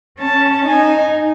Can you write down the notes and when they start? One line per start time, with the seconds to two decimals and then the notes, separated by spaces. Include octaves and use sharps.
0.20 C#4 A5
0.67 D#4 G#5